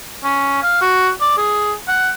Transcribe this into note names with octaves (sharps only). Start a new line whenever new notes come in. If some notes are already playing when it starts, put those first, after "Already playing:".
C#4
F5
F#4
D5
G#4
F#5